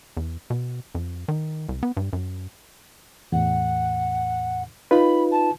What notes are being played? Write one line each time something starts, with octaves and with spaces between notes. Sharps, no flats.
E2
B2
F2
D#3
C2
B3
G2
F#2
E2 A2 F#5
D#4 F4 B4 B5
A5